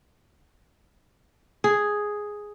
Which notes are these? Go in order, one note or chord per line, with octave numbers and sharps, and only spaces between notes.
G#4